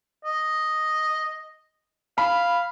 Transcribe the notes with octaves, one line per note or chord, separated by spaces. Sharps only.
D#5
F5 B5